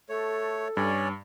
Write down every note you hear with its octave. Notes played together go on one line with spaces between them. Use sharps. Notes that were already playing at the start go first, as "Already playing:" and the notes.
A3 A4 C#5
G2 C#4 C#5 D5